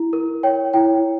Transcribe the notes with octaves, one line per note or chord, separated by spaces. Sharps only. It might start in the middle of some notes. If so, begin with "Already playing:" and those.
Already playing: E4
A#4
C#5 G5
E4 G5